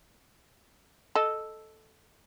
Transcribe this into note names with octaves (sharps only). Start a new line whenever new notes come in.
A4 D#5